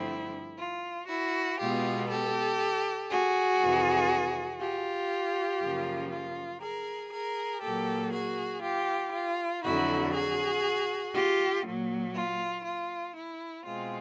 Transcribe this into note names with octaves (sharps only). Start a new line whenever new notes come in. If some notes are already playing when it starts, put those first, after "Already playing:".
Already playing: G2 D3 F3 A3 C4 E4
F4
E4 F#4
B2 G#3 B3 F4 G4
G4 A4
F#4 G#4
F2 C3 E3
F4 G4
F#2 C#3 F3 A#3
F4
G#4 A#4
G#4 A#4
A#2 F#3 A#3 G4 A4
F#4 G#4
F4 G4
F4
F2 D3 F#3 E4 F#4
F#4 G#4
F4 G4
A#2 F#3 A#3
F4
F4
E4
B2 G#3 C4 F4